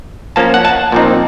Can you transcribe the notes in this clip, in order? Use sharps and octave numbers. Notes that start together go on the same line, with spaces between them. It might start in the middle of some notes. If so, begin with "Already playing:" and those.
F3 A#3 C#4 A5
F#5
A5
A#2 F3 C4 D#4